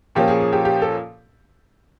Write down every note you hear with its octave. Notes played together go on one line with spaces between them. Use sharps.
A#2 F3 A#3 C#4 G4
G#4
G#4
G4
G4
A4